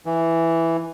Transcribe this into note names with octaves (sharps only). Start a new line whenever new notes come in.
E3